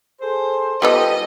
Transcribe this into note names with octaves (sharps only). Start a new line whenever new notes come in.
G#4 A4 C5
G3 B3 D#4 F4 G4 A4 D#5